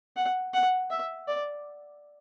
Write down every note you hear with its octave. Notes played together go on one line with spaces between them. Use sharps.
F#5
F#5
E5
D5